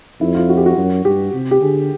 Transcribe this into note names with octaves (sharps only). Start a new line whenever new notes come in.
F2 E4
F4
F#4
G4
F#4
F#2
G2 G4
C3
G4
D3 G#4